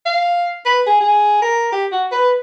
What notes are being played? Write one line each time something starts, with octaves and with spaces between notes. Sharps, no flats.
F5
B4
G#4
G#4
A#4
G4
F#4
B4